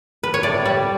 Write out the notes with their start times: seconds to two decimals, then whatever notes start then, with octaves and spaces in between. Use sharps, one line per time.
0.23 B4
0.34 C#5
0.43 A2 D5
0.65 G3